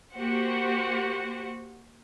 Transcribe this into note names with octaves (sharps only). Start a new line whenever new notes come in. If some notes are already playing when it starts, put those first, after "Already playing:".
A#3 F#4 G4 C5 F#5